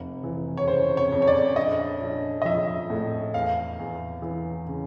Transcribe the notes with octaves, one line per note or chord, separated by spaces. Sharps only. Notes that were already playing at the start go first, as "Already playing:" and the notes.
Already playing: F1
E3
C#5
C#3 C5
C#5
F2
C#5
D5
A#1 D#5
A#1
D#5
F3 E5
A2
E2 F5
E2
E3
C#3